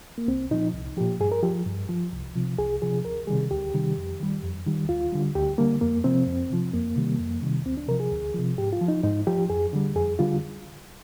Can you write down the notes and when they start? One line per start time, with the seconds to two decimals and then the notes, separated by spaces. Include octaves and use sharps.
0.18 A#3
0.28 C2 C4
0.51 A#2 F3 D#4
0.74 C2
0.97 A#2 F3 G4
1.20 G2 G#4
1.32 A#4
1.43 F3 G4
1.66 G2
1.89 F3
2.12 C2
2.35 C3 F3
2.58 C2 G#4
2.82 C3 F3 G#4
3.05 D2 A#4
3.27 C3 D#3 G3 G#4
3.51 D2 G4
3.74 C3 D#3 G3
3.97 F2
4.20 D#3 G3
4.43 F2
4.66 D#3 G3
4.89 D2 F4
5.12 D3 G3
5.35 D2 G4
5.58 D3 G3 A#3
5.81 F2 A#3
6.04 C3 F3 C4
6.27 F2
6.50 C3 F3
6.73 F2 A#3
6.96 C3 D#3 G3
7.20 F2
7.42 C3 D#3 G3
7.65 D2 C4
7.77 D4
7.88 C3 F3 A#4
8.00 G#4
8.12 D2
8.34 C3 F3
8.58 G#2 G4
8.73 F4
8.81 F3
8.88 D#4
9.03 G#2 D#4
9.27 F3 G4
9.50 F2 G#4
9.73 D3 G3
9.96 F2 G#4
10.19 D3 G3 F4